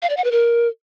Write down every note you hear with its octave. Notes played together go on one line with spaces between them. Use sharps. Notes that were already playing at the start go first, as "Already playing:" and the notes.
F5
D5
F#5
B4
A#4